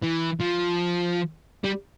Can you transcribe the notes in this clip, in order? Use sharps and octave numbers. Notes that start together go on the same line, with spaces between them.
E3
F3
G3